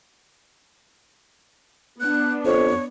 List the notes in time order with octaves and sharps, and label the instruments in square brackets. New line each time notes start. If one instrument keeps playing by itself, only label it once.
[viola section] B3 D4 [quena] F#6
[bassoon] F2 [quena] C#5